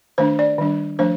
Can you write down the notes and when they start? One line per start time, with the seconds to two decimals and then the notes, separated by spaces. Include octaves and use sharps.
0.18 D#3 A3 D4 C5
0.39 D5
0.58 D#3 G3 D4
0.99 F3 A3 D4 C5